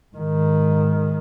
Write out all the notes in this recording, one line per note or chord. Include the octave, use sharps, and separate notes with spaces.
G#2 D#3